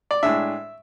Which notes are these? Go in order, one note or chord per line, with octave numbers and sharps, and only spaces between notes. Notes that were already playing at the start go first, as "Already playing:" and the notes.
D5
A2 G#3 D4 E5